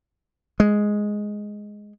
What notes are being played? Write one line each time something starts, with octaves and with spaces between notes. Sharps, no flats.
G#3